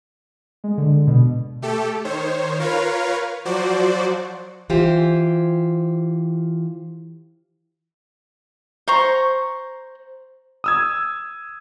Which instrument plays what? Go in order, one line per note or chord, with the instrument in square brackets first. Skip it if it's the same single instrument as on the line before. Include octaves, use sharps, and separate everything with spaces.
[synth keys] G#3
D3
B2
[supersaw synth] A3 G4 A4
D#3 C5 C#5
F4 A#4 B4 C#5 F5
F3 F#3 F#4 C5 D5
[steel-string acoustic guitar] E3 F4 G4 C5
[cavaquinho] C5 A#5 C#6
[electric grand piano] D#6 E6 G#6